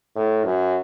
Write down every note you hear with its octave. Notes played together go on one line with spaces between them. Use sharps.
A2
F#2